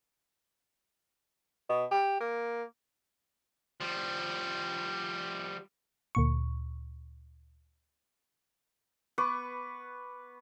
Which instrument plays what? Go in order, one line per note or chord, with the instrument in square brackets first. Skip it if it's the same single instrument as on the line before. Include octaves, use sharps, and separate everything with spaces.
[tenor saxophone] B2
G4
A#3
[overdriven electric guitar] F3 G3
[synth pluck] D2 A#2 C#6
[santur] B3 B4 C#6 D6